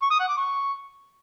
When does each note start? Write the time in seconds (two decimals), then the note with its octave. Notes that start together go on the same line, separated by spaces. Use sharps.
0.02 C#6
0.11 D#6
0.19 F#5
0.28 D6
0.37 C#6